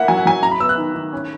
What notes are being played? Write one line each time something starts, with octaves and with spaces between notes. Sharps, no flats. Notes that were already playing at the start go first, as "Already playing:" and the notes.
Already playing: A#3 E4 E5 F#5
F#3 G#5
F#5
F#3 G#5
F#3 A#5
B5
B3 E6
F#6
D#3
D#3
C#4